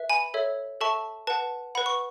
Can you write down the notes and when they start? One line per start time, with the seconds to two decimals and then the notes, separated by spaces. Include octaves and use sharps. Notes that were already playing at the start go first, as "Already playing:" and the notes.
Already playing: B4 E5
0.10 G#5 B5
0.34 A4 C#5 E5
0.81 A4 E5 A5 C#6
1.27 B4 F#5 A5
1.75 B4 F#5 B5
1.86 C#6